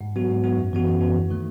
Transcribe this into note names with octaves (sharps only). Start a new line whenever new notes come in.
G#2
F#3 B3 F#4
G#2
F#3 B3 F#4
F#2
E3 B3 F#4
F#2
E3 B3 F#4
D#2
D#3 A3